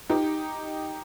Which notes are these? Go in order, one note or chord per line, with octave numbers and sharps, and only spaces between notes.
D#4 G4